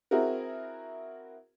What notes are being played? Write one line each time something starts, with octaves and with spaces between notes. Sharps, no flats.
C4 E4 F#4 G#4 A#4